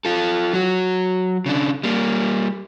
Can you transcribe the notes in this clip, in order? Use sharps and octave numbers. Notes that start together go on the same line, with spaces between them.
F4 A4
F#3 F#4
C#3 D4
G3 A#3